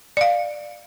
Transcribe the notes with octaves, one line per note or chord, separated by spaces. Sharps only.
D5 F5